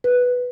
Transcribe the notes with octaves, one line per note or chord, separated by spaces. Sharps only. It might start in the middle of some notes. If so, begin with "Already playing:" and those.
B4